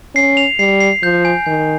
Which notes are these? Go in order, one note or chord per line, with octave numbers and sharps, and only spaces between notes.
C#4 C7
F7
G3 C7
C7
F3 G6
G#5
D#3 G#5